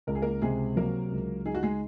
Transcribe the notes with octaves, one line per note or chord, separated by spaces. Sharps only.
C#2 A#4
G#4
A#3 A#4
C3 G#3 G#4
F#3 A#3 A#4
C#2
D#4 G#4
F#4
G#3 G#4